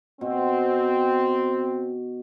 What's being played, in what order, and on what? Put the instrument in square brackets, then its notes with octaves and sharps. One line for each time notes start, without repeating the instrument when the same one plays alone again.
[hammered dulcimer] B2 [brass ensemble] C4